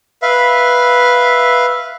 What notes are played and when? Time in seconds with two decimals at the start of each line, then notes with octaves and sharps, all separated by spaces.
0.22 B4 E5 F5